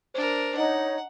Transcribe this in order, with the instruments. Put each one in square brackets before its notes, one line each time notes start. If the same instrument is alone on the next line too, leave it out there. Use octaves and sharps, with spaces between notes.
[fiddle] D4 A#4 [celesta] C5
[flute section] D#4 C#5 [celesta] D#5 A#5 [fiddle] F#5